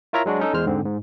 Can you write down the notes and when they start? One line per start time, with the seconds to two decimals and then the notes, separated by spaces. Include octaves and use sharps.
0.13 E4 F4 A#4 C#5 E5 A#5
0.26 F#3 G#3 D4 F#4
0.39 C#4 D#4 A4
0.54 E2 G#3 C5 F6
0.67 G#2 D3 C4
0.85 G#2